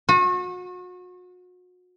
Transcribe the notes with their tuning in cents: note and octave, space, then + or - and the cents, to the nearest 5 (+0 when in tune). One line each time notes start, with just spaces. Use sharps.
F#4 -35